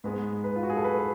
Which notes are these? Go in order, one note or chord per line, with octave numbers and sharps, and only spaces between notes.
G#2 G#3 B3 B4
B4
F4
F#4
G#4
A4
B4
B4